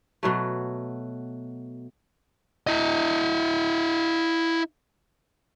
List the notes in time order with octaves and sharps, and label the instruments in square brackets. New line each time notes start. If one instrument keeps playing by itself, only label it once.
[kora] B2 F#3 A3
[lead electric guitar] E4 D#5